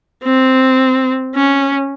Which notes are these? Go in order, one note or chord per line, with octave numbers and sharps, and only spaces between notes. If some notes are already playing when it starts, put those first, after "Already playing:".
C4
C#4